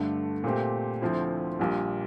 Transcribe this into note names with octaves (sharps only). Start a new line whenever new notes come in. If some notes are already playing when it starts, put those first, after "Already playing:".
Already playing: G2 D3 A3
A#2 A3 C4 G4
D2 D3 F3 C4 E4
A#1 A#2 G3